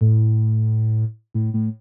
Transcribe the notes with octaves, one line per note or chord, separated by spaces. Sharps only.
A2
A2
A2